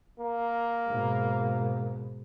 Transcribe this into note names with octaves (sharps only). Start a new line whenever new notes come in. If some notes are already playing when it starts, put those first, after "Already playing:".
A#3
G#2 B2